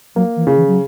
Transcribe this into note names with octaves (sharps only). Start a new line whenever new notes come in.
F#3 A#3
E3
C#3
E3
F#3